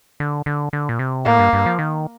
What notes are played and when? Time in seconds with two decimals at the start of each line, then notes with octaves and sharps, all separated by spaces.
0.20 D3
0.46 D3
0.73 D3
0.89 A#2
0.99 C3
1.25 A2 A#3
1.39 G2
1.53 G2
1.66 F3
1.79 D#3